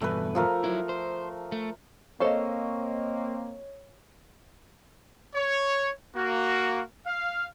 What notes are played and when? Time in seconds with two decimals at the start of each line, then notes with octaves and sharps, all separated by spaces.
0.01 E2 G2 B2 A3 B4
0.35 F3 A3 A#4
0.64 F#3 E4
0.89 C5
1.52 A3
2.20 A#3 C4 A4 C5 C#5 D#5 F5 C#6
5.35 C#5
6.15 A#3 F#4
7.06 F5